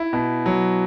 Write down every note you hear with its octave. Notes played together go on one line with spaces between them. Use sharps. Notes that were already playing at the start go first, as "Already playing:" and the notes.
Already playing: E4
B2
F#3